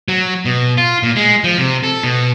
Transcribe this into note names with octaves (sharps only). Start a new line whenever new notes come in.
F#3
B2
F4
A#2
G#3
F3
C3
A4
B2